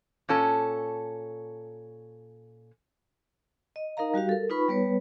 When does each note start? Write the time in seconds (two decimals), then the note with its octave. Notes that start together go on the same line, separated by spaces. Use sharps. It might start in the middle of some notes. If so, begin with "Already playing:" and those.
0.29 A#2 C#4 A4
3.76 D#5
3.97 D#4 A#4 D#5 F5 A#5
4.14 G3 F#4 G4 F5
4.29 A4 A#4
4.50 D#4 F4 B4 B5 C#6
4.68 G3 B3 B4 C#5